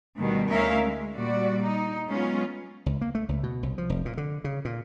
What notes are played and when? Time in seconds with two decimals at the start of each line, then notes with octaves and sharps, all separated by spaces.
0.18 D2 B2 D#3 G3
0.51 D2 C#4 D#4 A#4 E5 F5
0.82 G#3
1.16 A#2 G3 F#4 D5
1.63 D#4
2.10 F#3 G#3 B3 C#4 F4
2.86 C#2
3.01 A#3
3.15 A3
3.29 C#2
3.43 B2
3.63 C2
3.78 F3
3.90 F1
4.05 A#2
4.17 D3
4.44 C#3
4.65 A#2